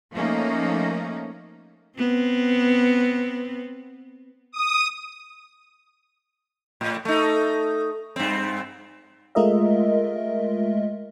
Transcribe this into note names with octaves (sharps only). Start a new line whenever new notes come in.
F3 A3 A#3 C#4 D#4
B3 C4
D#6
A2
A3 D#4
G2 C4
G#3 A3 F4 A#4 D#5 E5